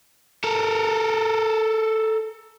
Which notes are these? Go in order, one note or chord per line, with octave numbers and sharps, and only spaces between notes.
A4 A#4